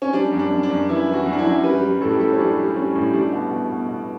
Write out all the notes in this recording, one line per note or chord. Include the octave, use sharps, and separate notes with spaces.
C#4
G3 D4
F#2
D4
F#2
D4
F#2
E3 E4
E3
F#4
F#2
D4
E4
F#2
G3 B4
G3
A2 A4
G4
G3 A4
C#4
G3 D4
G3
G3 C#4
A2
G3 D4
B2
B2
B2
B2